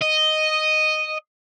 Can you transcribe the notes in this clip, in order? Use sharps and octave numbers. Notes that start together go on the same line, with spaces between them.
D#5